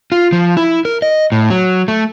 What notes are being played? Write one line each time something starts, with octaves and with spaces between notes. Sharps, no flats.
F4
F3
E4
A#4
D#5
A2
F#3
A3